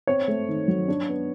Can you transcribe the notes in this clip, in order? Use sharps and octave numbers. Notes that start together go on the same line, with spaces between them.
C4 C#5
A3
D#3
F#3
D4
B3